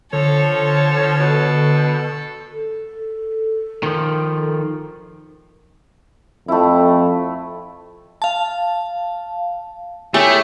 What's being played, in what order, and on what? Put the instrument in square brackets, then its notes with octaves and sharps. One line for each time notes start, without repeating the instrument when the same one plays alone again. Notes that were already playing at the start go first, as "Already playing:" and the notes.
[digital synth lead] D3 [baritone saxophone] F3 [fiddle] A4 [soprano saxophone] C#5
[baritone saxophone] B2
[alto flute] A4
[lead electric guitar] D#3 F3
[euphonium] F2 [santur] A3 E4
[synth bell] F5 A5
[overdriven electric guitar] A3 [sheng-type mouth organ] E4 G4 C#5 [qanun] G#4